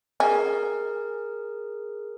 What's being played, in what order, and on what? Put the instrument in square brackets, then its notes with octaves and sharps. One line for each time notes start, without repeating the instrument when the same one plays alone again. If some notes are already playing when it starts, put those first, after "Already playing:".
[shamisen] C#4 [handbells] G#4 A#4